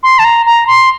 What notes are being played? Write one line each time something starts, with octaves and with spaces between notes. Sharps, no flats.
C6
A5
A#5
A#5
C6